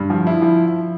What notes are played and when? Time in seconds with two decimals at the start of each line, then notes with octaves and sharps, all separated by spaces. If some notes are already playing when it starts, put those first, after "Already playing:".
Already playing: G2
0.10 F3
0.27 E4
0.42 F3